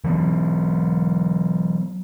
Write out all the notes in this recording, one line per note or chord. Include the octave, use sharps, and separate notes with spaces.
E3 F#3 A3 B3